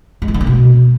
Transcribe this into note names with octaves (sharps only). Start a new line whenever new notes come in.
G#3
E3
D3
A#3
B2